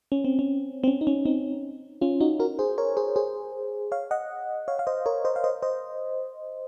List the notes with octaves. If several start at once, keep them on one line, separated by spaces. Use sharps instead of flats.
C#4
C4
C#4
C4
C#4
D#4
C#4
C4 D#4
C#4 F4
D#4 F#4
F#4 A#4
G#4 C5
A#4 C#5
G#4 C5
G#4 C5
C#5 F5
D#5 F#5
C#5 F5
F5
C5 D#5
A#4 C#5
C5 D#5
F5
C5 D#5
C5 D#5